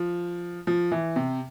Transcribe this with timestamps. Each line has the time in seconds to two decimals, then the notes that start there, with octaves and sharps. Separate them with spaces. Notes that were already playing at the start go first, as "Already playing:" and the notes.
Already playing: F3
0.67 F3
0.91 E3
1.16 C3